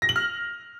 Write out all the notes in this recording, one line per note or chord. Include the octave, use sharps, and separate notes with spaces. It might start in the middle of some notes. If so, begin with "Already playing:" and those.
A#6
F#7
F6